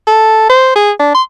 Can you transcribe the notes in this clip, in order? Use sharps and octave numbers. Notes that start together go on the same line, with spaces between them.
A4
C5
G#4
D4
C6